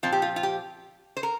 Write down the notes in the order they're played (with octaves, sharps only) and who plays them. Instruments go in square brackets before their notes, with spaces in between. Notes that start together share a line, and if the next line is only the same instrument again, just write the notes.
[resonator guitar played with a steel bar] A#2 F3 C4 F4
G4
F4
F4
G4
C5
A#4